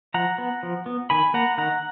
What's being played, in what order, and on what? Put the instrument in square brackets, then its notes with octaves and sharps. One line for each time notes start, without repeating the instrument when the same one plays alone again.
[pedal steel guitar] F3 F#5 A#5
B3
F3
B3
D#3 G#5 B5
A#3 F#5 A#5
D#3 F#5 A#5